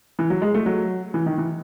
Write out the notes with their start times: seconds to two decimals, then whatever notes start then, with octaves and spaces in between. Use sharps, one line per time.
0.19 E3
0.30 F#3
0.42 G#3
0.54 A3
0.66 F#3
1.14 E3
1.26 D#3
1.38 E3